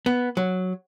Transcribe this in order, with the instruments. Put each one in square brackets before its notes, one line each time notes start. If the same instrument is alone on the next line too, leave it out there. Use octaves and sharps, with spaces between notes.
[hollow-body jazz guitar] B3
F#3